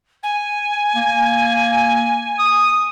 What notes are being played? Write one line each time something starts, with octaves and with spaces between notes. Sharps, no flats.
G#5
A#3
D#6